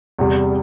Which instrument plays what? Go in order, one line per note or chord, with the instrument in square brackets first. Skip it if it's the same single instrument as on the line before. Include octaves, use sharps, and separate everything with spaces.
[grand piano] E2 C3 G3